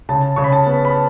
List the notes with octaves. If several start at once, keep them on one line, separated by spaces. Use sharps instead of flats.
C#3 A5
C#3 C#6
B5
A5
B3
B5